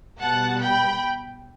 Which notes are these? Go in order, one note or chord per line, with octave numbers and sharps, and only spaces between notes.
B2 G3 B3 F#5 A5
G5 B5